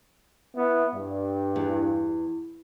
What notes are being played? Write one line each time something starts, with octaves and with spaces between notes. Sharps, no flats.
B3 E4
G2
E2